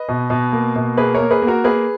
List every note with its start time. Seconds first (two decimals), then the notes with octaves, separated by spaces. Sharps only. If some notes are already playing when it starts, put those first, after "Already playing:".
Already playing: B4 D#5
0.09 B2
0.30 B2
0.53 A#3
0.76 B2
0.97 A#3 G#4 B4
1.14 A#4 C#5
1.20 A#3
1.31 G#4 B4
1.42 A#3
1.47 F#4 A#4
1.64 A#3 G#4 B4